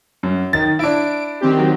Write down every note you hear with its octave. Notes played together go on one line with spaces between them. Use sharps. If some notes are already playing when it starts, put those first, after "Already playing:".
F#2
D#3 A6
D4 E4 D7
D#3 C4 G4
F#3